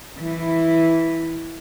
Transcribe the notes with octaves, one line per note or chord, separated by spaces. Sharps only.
E3 E4